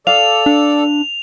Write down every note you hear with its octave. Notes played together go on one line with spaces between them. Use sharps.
A4 D5 F5 F7
D4